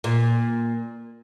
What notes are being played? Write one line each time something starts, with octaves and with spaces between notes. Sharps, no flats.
A#2